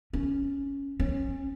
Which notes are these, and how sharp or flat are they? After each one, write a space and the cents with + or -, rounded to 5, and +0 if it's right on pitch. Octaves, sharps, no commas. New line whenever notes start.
C#4 +5
C#4 -25